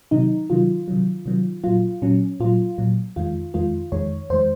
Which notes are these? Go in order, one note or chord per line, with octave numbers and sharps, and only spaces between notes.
C3 D#3 F#3 D#4
C3 D#3 F#3 F4
C3 D#3 F#3
C3 D#3 F#3
A#2 F#3 F4
A#2 F#3 C#4
A#2 F#3 F4
A#2 F#3
F2 D#3 G#3 F4
F2 D#3 G#3 F4
F2 D#3 G#3 C#5
F2 D#3 G#3 C5